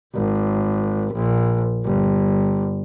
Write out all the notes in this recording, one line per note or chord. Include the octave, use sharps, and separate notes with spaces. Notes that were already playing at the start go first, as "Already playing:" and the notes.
G#1
A#1
G1